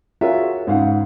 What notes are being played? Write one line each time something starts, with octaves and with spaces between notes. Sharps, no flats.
F4 F#4 G#4 A#4 C#5 E5
G#2 C#3 F5 F#5